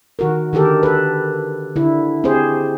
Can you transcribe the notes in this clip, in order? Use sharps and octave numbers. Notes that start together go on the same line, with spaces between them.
D#3 F#4 A#4
D3 D#3 G4 A4 A#4
A4 B4
D3 E4
C4 G4 G#4 C5